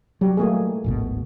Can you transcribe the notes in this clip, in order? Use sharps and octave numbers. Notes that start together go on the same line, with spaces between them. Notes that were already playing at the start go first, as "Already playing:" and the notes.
F#3 G3 G4
A3 A#3 G#4
D1 G#1 B2